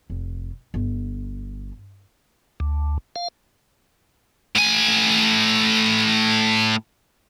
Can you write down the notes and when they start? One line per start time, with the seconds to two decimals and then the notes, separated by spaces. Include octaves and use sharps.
0.10 F1
0.74 G1
2.60 D2
3.16 F5
4.56 A2 G#5